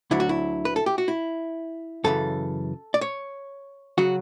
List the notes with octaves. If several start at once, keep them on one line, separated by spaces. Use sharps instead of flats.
D2 D3 F#3 E4
F#4
E4
B4
A4
G4
F#4
E4
F#2 C#3 E3 A4
D5
C#5
C#3 F#3 F#4